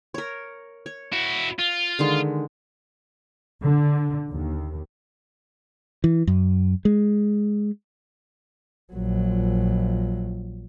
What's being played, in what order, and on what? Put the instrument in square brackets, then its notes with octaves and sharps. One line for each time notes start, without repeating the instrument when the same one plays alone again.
[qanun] A#4 C#5
C#5
[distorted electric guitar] E4 F#4
F4
[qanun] D3 D#3 G#3
[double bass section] D3
D#2
[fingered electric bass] E3
F#2
G#3
[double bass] A#1 F#3